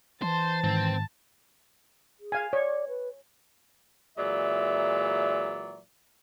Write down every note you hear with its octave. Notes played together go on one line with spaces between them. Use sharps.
E3 C5 A5
G#2 D#3 C4
G#4
F5 G#5
C#5 D5
B4
A#2 E3 F#3 G#3 D5 E5